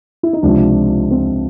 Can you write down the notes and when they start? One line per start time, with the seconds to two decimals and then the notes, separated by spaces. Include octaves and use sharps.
0.23 E4
0.33 D#4
0.43 C#2 C3 F3 D4
1.11 C4